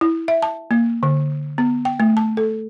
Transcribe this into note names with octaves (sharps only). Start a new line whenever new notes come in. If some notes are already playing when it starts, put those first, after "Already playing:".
E4
E5
A5
A#3
D3
B3
G5
A3
A5
A4